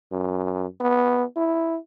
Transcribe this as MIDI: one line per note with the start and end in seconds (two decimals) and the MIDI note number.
0.12 0.66 42
0.80 1.24 59
1.36 1.77 64